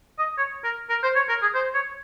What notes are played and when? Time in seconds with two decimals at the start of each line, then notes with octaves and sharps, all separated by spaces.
0.19 D#5
0.38 C#5
0.64 A#4
0.90 A#4
1.03 C5
1.16 C#5
1.29 A#4
1.42 G#4
1.55 C5
1.74 C#5